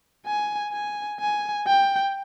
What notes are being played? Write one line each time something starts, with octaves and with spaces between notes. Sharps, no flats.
G#5
G#5
G#5
G5